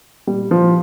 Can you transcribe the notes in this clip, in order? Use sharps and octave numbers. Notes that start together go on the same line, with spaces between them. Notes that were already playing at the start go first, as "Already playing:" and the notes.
A#2 G3
F3